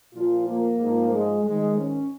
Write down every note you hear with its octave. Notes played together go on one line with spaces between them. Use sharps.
A#2 F3 F4
A#3
G#2 F3
G#3
G#2 D#3 G#3
C#4